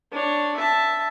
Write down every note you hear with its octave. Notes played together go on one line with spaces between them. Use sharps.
D4 C#5
E5 A5